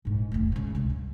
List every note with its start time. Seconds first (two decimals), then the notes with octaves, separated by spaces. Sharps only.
0.05 A#1 G#2
0.32 F1 D2
0.52 G#2 C#3
0.75 C#2 C3
0.90 G3